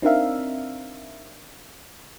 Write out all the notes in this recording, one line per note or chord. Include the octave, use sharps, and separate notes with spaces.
C4 D4 D#4 A#4 E5 F5